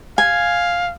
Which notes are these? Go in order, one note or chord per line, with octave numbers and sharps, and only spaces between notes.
F5 G#5